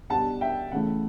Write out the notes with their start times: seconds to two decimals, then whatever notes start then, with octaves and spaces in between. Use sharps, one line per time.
0.10 B2 G3 D4 F#5 A5
0.41 E5 G5
0.72 C#3 E3 A3 E4 F#5